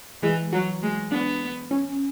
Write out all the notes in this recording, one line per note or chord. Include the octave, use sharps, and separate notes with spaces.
E3 G#3
F#3 F#4
G#3
B3 D4
C#4